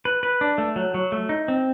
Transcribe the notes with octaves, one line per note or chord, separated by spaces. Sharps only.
B4
B4
D4
A3
F#3
F#3
A3
D#4
C4